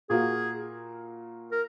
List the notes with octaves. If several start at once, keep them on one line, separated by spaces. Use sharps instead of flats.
A#2 A#3 F#4 G#4
A#4